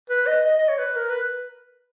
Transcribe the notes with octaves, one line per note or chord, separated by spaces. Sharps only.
B4
D#5
D#5
D#5
C#5
B4
A#4
B4